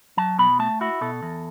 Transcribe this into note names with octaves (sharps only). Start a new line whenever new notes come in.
F#3 A5
B2 B5
A3 A5
E4 F#4
B2 A4
E2